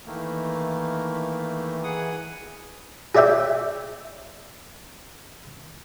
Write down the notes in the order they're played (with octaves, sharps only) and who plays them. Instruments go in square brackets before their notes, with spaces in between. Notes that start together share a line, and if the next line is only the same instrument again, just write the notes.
[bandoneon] D#3 A3 A#3 [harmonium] E3
[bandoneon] G#4 F#5 D#6
[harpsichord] G#4 C#5 D5 E5 G5